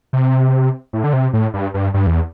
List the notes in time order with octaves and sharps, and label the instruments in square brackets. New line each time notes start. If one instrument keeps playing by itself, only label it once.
[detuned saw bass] C3
A2
D3
C3
A2
G2
G2
G2
E2